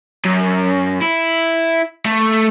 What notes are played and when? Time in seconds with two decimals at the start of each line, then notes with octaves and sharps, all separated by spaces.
0.25 F#2
1.01 E4
2.05 A3